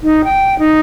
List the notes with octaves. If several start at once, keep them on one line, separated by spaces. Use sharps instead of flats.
D#4
G5
D#4